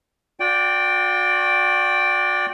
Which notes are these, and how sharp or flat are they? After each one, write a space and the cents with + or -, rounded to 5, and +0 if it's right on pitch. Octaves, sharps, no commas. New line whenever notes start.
F#4 -35 D5 +0 G5 +0